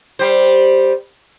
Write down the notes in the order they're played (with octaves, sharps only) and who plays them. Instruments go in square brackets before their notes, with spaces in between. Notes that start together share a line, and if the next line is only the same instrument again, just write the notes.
[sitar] G3 C5